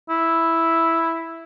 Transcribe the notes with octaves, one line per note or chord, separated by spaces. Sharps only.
E4